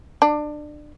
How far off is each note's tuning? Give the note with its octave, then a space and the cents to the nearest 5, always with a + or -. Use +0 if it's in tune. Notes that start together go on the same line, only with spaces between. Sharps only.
D4 +25